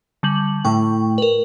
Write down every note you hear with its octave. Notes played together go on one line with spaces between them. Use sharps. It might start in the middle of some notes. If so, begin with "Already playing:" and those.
D3 G3 F#7
A2 G5 C#6
A#4 B4